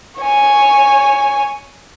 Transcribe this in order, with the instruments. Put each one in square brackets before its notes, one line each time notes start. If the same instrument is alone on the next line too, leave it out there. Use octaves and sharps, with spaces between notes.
[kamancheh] C#5 G#5